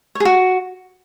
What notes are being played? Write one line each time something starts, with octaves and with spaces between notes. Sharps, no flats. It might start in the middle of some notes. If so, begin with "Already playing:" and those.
C#5
G#4
F#4